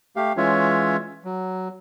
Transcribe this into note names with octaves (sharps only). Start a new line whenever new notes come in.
A3 G4 F5
E3 G#3 C#4 F4 C#5 E5
F#3